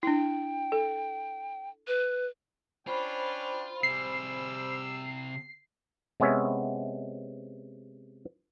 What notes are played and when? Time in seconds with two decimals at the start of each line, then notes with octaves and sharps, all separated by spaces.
0.03 D4 E4 G5
0.72 A4
1.87 B4
2.87 C#4 D4 F4 C5 G5 B5
3.83 C3 G3 G#4 E6 C7
6.20 C3 G#3 B3 C#4 C#5 E5